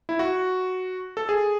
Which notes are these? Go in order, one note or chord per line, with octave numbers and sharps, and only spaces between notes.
E4
F#4
A4
G#4